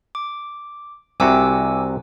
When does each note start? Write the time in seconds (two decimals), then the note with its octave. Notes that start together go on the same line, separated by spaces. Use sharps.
0.15 D6
1.20 C2 C3 F#4 G#5 D6 E6